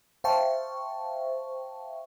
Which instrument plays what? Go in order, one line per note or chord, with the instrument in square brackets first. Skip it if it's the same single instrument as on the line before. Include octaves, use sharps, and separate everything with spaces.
[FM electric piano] C5 E5 F5 G5 A5 C#6